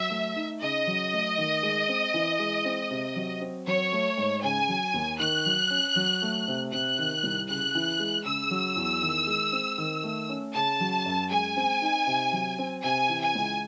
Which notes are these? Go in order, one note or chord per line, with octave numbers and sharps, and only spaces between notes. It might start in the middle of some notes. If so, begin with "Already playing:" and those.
Already playing: F#3 E5
A3
D#4
C#3 D#5
F#3
A3
D#3
G#3
C4
E3
G#3
C4
C3
F#3
C4
F#3 C#5
A3
G#2
C#3 G#5
F#3
D#2
D#3 F#6
F#3
C#4
F#3
A3
C3
C3 F#6
D#3
C2
C#3 F#6
E3
G#3
C#3 E6
F#3
E2
D#3
G#3
C4
D#3
A3
C#4
C#3 A5
F#3
F#2
G#3 G#5
C4
D#4
C3
F#3
C4
C3 G#5
E3
G#5
C#2